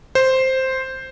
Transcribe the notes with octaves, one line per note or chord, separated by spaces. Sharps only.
C5